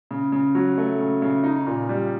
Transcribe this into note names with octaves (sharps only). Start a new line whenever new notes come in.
C#3
C#3
F#3
A3
C#3
C#3
D#4
A#2
G3